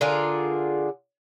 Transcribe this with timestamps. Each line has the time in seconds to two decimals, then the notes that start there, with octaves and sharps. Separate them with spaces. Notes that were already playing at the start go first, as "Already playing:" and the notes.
0.01 D3 F4 G#4 A#4